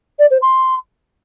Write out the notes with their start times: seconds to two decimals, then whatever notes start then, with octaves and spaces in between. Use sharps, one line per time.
0.19 D5
0.30 C5
0.42 C6